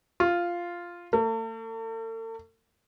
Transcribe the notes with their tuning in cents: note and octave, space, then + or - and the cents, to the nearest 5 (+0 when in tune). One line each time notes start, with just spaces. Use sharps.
F4 -5
A3 +45